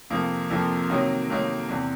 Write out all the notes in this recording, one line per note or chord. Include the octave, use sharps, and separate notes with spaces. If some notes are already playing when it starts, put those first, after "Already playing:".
F2 C3 F3 A#3
F2 C3 F3 A#3
C3 D#3 F#3 A#3 D#4
C3 D#3 F#3 A#3 D#4
E2 C3